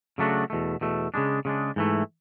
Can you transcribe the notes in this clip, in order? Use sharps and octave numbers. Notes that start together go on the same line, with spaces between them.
C#3 F#3 A3 D4 F#4
E2 B2 A3
E2 B2 A3
C#3 G#3 D4
C#3 G#3 D4
G#2 E3 A3